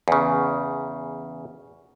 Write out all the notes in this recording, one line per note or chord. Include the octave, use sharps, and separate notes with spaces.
E2 C#3